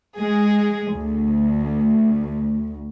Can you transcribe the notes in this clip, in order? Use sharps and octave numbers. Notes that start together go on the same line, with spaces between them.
G#3 G#4
D2